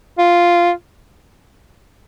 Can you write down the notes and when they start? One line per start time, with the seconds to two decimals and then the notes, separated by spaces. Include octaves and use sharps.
0.19 F4